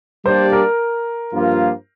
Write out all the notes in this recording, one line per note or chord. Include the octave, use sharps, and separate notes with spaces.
G3 A#3 D4 G4 C5 D5
A#4
G2 F3 A#3 F4